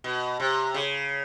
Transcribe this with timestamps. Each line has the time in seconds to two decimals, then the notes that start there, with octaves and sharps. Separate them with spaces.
0.04 B2
0.40 C3
0.74 C#3